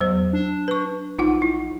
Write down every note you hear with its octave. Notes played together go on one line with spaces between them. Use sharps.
E2 F#3 C5
D4
B4 C#6
A#1 D#4 F4 F#5
E4